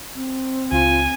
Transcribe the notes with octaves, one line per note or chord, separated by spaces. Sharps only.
C4
C#2 F4 G#5